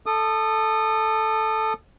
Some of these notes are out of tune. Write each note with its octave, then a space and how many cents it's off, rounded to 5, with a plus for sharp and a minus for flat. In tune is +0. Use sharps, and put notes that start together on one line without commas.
A4 +0 D#6 -25